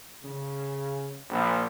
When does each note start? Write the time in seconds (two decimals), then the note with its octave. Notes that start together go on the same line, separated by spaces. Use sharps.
0.24 C#3
1.30 A#1